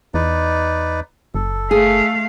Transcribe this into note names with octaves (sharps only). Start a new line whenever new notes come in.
E2 D#4 B4 D5
F#1 A4
A3 G#4 F5